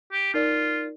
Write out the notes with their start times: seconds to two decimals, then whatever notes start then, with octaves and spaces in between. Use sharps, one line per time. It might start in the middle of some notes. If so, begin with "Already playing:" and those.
0.12 G4
0.34 D#4 F4 A#4 D5